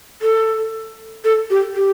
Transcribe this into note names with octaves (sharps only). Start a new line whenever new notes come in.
A4
A4
G4
G4